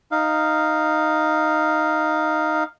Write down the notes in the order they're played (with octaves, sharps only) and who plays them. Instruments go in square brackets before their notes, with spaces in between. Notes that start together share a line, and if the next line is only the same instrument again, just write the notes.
[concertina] D#4 F5